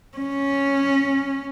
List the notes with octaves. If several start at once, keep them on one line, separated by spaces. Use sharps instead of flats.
C#4